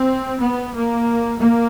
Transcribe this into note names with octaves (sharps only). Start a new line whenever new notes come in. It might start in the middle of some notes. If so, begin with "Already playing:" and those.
Already playing: C4
B3
A#3
A#3